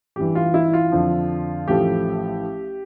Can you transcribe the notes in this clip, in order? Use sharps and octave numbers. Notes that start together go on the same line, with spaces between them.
A1 G2 E3 G4
F4
E4
F4
F2 D3 F3
A1 A2 F3 A3 G4